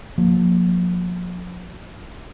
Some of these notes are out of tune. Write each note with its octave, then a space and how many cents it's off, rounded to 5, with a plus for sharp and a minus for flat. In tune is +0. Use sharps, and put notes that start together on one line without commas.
F3 +40 A#3 +0